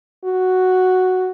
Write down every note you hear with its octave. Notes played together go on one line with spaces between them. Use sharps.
F#4